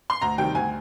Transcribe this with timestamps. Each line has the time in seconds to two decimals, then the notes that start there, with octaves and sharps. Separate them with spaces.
0.10 C6
0.21 D2 A#5
0.38 C3 D#3 G3 G5
0.55 D2 G#5